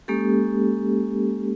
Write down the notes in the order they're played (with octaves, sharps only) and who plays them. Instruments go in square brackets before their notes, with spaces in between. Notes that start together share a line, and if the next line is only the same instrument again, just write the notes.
[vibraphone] G#3 A#3 C#4 G4 A4